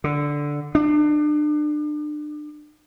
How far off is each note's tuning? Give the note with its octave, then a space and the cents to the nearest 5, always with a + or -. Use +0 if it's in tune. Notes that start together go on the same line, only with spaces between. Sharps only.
D3 -5
D4 +35